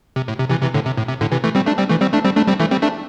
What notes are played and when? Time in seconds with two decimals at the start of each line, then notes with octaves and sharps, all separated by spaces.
0.16 C3
0.28 A2
0.39 C3
0.50 C3 E3
0.62 C3 E3
0.74 A2 D3
0.86 C3
0.97 A2
1.08 C3
1.21 A2 D3
1.31 C3 E3
1.44 E3 A3
1.55 G3 C4
1.66 A3 D4
1.78 G3 C4
1.89 E3 A3
2.01 G3 C4
2.13 A3 D4
2.24 G3 C4
2.36 A3 D4
2.47 G3 C4
2.60 E3 A3
2.71 G3 C4
2.82 A3 D4